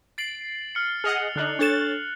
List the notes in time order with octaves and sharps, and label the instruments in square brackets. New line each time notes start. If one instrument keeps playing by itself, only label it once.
[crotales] A6 C7 F#7 [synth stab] D7
[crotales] F6 C#7
[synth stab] G#4 D#5 F#5 [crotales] F6 F7
[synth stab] D3 D4 D#4 [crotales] F6 F#6 F#7
[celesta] D4 A4 E7 [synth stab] C#5 A6